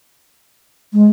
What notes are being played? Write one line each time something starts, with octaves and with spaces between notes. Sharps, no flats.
G#3